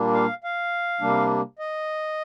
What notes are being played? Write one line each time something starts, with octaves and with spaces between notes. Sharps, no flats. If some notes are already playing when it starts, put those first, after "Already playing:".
Already playing: A#2 G3 A#3 D4
F5
F5
C3 G3 A#3 D4
D#5